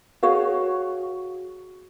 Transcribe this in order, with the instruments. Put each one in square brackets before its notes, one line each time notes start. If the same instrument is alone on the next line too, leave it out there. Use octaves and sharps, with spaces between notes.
[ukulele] F#4 G#4 C#5 F5